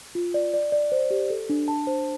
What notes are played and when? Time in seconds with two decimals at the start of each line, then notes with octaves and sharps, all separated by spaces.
0.15 F4
0.34 D5
0.54 D5
0.72 D5
0.92 C5
1.11 G4
1.30 A4
1.50 D4
1.68 A5
1.87 C5